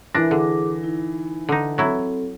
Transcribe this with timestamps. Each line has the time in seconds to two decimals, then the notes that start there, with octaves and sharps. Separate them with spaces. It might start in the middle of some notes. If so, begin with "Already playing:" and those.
0.15 E3 D4 A#4 E5 A#6
0.31 D3 G#4 D6
0.84 D#4 E4
1.49 D3 D#4
1.78 F#3 C4 E4 A4